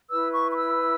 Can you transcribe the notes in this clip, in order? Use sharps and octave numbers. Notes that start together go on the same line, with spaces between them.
E4 B4 E6
C#6
C#6
E6